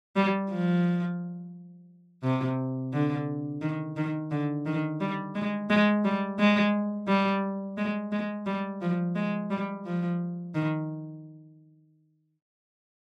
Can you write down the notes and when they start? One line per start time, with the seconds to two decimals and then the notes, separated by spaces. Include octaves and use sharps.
0.16 G3
0.51 F3
2.24 C3
2.93 D3
3.62 D#3
3.97 D#3
4.31 D3
4.66 D#3
5.00 G3
5.35 G#3
5.70 G#3
6.04 G3
6.39 G#3
7.08 G3
7.78 G#3
8.12 G#3
8.46 G3
8.81 F3
9.16 G#3
9.50 G3
9.85 F3
10.55 D#3